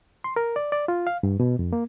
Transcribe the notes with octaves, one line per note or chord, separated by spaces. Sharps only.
C6
A#4
D5
D5
F4
F5
G2
B2
F2
A#3